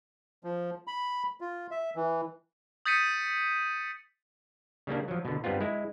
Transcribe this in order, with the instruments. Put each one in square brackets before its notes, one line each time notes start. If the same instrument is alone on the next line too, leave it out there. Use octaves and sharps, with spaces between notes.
[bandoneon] F3
B5
F4
E5
E3
[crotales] D#6 G6 A6 B6 C#7 D#7
[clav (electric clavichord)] C#3 G3 A#3 D4
F3 F#3
B2 D3
G2 G3 B3 C4 F4
G#3 E4